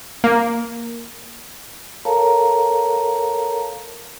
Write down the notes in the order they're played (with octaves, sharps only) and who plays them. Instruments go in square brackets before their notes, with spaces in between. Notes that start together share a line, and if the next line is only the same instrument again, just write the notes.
[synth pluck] A#3
[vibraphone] A4 A#4 C#5 F5 A5 A#5